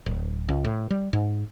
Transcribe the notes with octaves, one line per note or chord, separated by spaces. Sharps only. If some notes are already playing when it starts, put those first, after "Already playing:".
D1
C#2
A2
G3
G#2